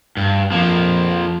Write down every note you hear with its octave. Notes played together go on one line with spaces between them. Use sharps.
G2
F2 F3 A#3